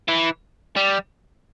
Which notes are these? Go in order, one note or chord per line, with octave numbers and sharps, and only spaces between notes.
E3
G3